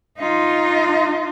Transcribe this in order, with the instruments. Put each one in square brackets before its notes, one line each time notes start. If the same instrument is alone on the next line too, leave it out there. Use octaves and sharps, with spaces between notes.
[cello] D#4 F4